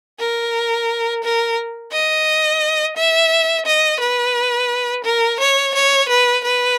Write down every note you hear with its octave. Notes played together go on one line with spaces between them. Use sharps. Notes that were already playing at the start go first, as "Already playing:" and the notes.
A#4
A#4
D#5
E5
D#5
B4
A#4
C#5
C#5
B4
B4